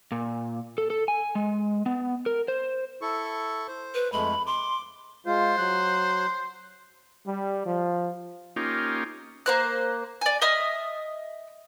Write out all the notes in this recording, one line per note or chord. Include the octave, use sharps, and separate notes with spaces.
A#2
A4
A4
G#5
G#3
B3
A#4
C5
E4 A4 C#6
C5
B4
F2 G#3 A3 B5
C6 D6
G#3 F4 C5
F#3 F#6
G3
F3
A#3 C#4 D#4 F4 G4
A#3 C5 F#6
D5 G#5
D#5 E5 D#6 F6